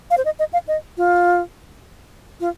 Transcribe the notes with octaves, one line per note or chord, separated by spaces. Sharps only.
F5
C5
D#5
D#5
F5
D#5
F4
F4